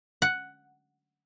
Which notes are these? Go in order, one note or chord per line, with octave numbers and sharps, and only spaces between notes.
F#5